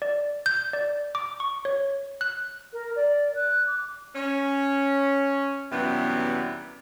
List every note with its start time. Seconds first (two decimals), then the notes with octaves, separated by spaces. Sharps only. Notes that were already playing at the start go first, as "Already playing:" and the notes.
0.02 D5
0.46 G6
0.73 D5
1.15 D6
1.40 C#6
1.65 C#5
2.21 F#6
2.73 A#4
2.96 D5
3.35 F#6
3.67 D6
4.15 C#4
5.72 F#2 C3 E3 G3 B3